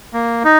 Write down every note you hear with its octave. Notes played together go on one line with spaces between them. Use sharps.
A#3
D#4